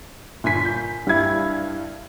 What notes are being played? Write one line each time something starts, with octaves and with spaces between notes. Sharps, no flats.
G1 A#2 G#5 B6
G6
G2 G3 E4 G#6